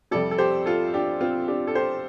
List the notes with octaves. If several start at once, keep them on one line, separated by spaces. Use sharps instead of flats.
F2 C3 G3 A4 D5
A4
G4 C5
F4 A4
D4 G4
C4 F4
D4 G4
A4
G4 C5